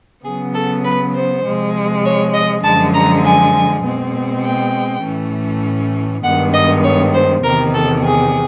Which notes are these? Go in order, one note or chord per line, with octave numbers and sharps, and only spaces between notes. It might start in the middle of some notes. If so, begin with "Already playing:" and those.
C#3 F#3 B3 G#4
A4
B4
C5
C3 F3 G#3
C#5
D#5
F#2 D3 F3 G#3 A5
A#5
G#5
B2 G#3 C4
G5
A2 E3 A3 C#4
G2 D#3 G#3 B3 F#5
D#5
C#5
C5
E2 C3 D#3 A#4
A4
G#4